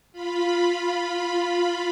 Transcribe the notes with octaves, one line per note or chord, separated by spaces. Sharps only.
F4 B5